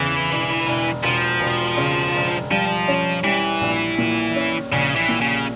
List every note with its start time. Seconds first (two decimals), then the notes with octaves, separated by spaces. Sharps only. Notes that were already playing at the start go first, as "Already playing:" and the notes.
Already playing: E2 C#3 E3
0.30 E1
0.66 E1
1.03 E1 F3
1.40 E1
1.77 C#3
2.14 E1
2.51 F3 G3
2.88 C#4
3.24 E3 G3
3.61 A#1
3.98 A#2
4.35 C#4
4.72 A#1 C#3
4.96 E3
5.09 A#2
5.21 C#3